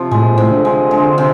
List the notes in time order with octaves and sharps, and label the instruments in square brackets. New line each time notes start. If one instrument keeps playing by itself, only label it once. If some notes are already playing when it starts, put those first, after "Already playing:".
Already playing: [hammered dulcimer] C3 F3
[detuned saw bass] A2 [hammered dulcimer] G#3
[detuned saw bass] A#2
[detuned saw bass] A2 [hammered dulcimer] C3
[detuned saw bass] D3
[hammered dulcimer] G#3
G#3
C3